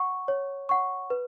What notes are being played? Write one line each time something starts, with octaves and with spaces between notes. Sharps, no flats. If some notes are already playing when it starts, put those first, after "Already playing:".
Already playing: F#5 C#6
C#5
F#5 C#6
B4